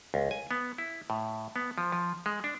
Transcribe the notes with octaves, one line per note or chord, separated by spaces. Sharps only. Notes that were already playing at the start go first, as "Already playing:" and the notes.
C#2
G#5
B3
E4
A2
B3
F3
F3
G#3
D4